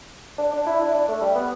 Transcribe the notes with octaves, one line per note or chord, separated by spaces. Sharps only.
D4
D4
E4
D4
D4
A3
G3
B3